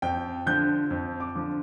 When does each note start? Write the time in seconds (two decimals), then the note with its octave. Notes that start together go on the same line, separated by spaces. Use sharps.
0.02 F2 G5
0.46 D3 F3 G6
0.91 F2
1.20 D6
1.35 D3 F3